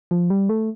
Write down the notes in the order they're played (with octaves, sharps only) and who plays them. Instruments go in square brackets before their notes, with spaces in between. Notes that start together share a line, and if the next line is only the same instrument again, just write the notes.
[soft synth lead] F3
G3
A3